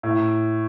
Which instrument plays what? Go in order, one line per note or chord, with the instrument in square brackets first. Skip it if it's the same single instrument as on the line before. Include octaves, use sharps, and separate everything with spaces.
[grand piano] A2